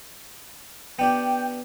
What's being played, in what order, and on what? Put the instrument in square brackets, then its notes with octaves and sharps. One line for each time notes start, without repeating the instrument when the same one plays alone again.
[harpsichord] B3 D4 G4 [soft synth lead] G5